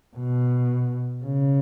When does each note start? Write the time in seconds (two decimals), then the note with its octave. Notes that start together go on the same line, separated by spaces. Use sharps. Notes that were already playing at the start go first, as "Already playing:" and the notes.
0.17 B2
1.25 C#3